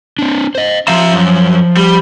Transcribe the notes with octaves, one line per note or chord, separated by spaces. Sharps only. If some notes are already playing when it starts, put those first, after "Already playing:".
C4 D4
C5 D#5
F3 E5 F5 A#5
F#2
G3